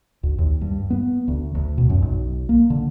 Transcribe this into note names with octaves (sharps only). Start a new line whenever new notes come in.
D2
D#2
G2
B3
D2
D2
B2
F#2
B1
A#3
D3